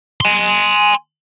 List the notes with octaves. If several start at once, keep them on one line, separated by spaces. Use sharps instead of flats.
G#5 C6